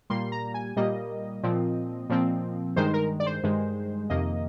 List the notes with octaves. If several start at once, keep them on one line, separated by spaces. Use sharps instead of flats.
A#2 G3 A#3 C6
A#5
G#5
A#2 G3 A#3 D#5
A#2 F3 C4
A#2 F3 C4
G2 D#3 G#3 C5
A#4
D5
C5
G2 D#3 G#3
F2 C3 D#3 A#3 D#5